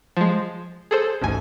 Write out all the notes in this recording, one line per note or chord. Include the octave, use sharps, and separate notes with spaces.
F3 G#3
G#4 A4 C5
A1 D2 G#2 G#5